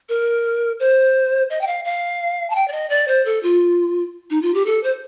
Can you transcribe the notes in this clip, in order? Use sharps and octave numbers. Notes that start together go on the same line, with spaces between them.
A#4
C5
D#5
G5
F5
F5
A5
G5
D5
D#5
D5
C5
A4
F4
D#4
F4
G4
A4
C5